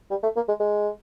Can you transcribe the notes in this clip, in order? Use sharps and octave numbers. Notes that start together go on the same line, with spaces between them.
G3
A3
A#3
G#3
G#3